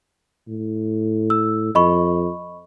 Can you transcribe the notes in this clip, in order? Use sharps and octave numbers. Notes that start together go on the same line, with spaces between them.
A2
E6
F2 D#5 B5 C#6